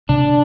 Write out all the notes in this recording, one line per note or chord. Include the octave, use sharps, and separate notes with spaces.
C3 D4